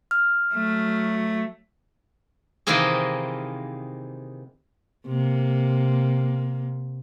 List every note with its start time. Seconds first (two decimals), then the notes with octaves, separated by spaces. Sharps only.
0.11 F6
0.54 F#3 A3
2.67 C3 D#3 E3 A#3 C4 G#4
5.07 C3 A#3